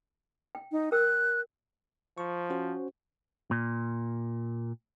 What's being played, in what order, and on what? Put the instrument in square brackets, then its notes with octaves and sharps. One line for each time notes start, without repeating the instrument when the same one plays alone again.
[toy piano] G5
[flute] D#4
[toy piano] A#4 G5 E6 [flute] F#6
[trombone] F3 [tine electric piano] C#6
[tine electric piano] C#4 F#4 C5
[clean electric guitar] A#2